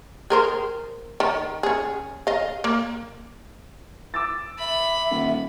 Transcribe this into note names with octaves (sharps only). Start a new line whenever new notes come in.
G#4 A#4 C5
D#3
C#4 G#4
D#5 F5
A#3
D6 E6 A6
E5 B5
D#1